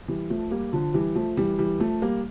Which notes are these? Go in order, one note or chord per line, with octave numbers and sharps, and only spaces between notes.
E3 G3
F3 A3
G3 A#3
D3 F3
E3 G3
F3 A3
E3 G3
E3 G3
F3 A3
G3 A#3